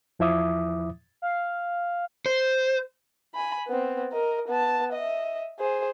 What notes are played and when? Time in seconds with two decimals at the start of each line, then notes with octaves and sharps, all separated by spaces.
0.19 E2 F3 E4 E5 D6 D#6
1.22 F5
2.26 C5
3.35 G#5 B5
3.68 B3 C4
4.12 A#4 D#5
4.48 B3 A5
4.93 D#5 E5
5.59 G#4 C5